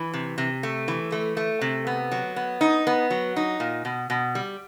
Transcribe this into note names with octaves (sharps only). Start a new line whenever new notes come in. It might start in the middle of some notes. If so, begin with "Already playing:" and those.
Already playing: E3
C3
C3
A3
E3
A3
A3
C3
B3
F#3
B3
D#4
B3
F#3
D#4
A#2
B2
B2
G3